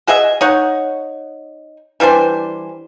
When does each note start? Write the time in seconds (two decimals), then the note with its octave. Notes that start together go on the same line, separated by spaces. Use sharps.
0.07 F#4 G#4 D#5 E5
0.41 D#4 C#5 F#5
2.00 E3 G3 D4 C5